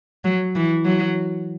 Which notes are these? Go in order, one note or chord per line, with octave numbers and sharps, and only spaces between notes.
F#3
E3
F#3